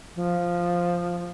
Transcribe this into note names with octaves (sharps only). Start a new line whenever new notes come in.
F3